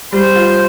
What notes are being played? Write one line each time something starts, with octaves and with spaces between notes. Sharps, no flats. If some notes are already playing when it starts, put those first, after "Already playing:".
G3 C5
F4